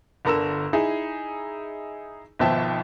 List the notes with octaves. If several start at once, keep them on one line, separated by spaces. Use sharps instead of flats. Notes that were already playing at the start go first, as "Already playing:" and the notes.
G1 D3 A#4 A#5 E6 E7
D#4 E4 G#4
G#1 B2 F3 E5 G5 A5